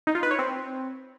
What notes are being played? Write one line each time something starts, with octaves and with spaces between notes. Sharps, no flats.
D#4
F4
B4
C#5
C4